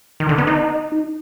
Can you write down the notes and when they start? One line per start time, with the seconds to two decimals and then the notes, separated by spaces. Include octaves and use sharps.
0.20 D#3
0.29 D3
0.38 B3
0.47 D#4